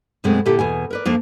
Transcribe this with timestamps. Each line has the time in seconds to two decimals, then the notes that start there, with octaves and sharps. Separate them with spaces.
0.24 F#2 B2 G#3 A3 C4
0.45 A#2 D3 E4 G4 A4
0.59 E2 B2 G#5
0.90 A#4 B4 D5
1.05 F2 F3 A#3 D4 F5